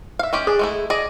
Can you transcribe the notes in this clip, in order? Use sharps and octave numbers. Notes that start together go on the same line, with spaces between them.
E5 F5
G#3 C#4 G4
D4 G#4
G#3 A3 E4
G#4 D5 D#5